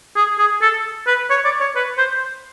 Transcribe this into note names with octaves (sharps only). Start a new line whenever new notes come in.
G#4
G#4
A4
B4
C#5
D5
C#5
B4
C5